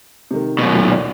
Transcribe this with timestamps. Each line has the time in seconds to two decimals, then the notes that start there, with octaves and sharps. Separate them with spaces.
0.31 C3 D#3
0.59 F#2 B2
0.73 D2 A#2 F#3
0.92 D5